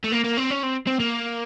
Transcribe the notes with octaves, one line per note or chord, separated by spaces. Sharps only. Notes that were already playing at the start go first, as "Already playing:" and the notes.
A3
A#3
A#3
C4
C#4
C4
C4
A#3